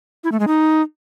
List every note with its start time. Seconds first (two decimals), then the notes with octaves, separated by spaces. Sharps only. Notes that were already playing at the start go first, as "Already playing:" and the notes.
0.24 E4
0.32 A3
0.40 G#3
0.48 D#4